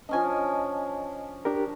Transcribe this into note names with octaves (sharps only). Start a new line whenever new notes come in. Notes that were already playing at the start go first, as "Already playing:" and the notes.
F3 C#4 D4 D#5 G#5
D4 G4 A#4